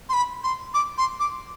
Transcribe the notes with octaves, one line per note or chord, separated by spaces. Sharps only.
C6
B5
C6
D6
C6
D6